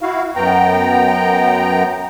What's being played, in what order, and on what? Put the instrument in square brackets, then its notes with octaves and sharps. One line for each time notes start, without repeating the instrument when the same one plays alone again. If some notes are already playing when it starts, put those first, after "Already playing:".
[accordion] E4 F#4 F5
F#2 B3 G5 A#5